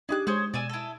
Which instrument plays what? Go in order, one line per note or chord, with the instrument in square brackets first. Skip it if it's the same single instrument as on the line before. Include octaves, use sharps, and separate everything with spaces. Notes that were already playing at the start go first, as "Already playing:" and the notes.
[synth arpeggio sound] D4 D#4 G4 [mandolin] G#4 D6 F#6
[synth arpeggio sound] G#3 [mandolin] G#4 C5 C#5
[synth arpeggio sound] B2 D#7 E7 [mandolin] D5 G#5 E6
[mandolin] E4 A4